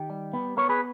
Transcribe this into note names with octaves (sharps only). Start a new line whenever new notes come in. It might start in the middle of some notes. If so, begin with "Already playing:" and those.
Already playing: D#3 G4
G3
B3
B3 A#4 C#5
G#4 B4